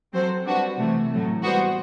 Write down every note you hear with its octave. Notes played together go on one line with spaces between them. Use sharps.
F#3 C4 F#4 A4 C5
G3 D4 F#4 B4
C3 E3 A3
A2 F#3 A3
G3 B3 F#4 C5